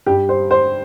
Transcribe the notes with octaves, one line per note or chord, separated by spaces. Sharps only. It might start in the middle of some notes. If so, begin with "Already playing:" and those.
G2 G3 G4
C5
C5